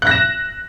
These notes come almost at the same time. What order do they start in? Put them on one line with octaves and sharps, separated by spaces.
F#6 A#6 E7